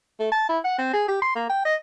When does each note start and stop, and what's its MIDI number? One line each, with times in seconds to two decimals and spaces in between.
0.19 0.30 57
0.32 0.46 81
0.49 0.58 64
0.64 0.76 78
0.78 0.89 60
0.93 1.05 68
1.08 1.20 67
1.22 1.34 84
1.35 1.48 58
1.49 1.64 79
1.65 1.75 75